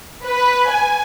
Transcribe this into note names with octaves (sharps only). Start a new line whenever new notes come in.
B4
G#5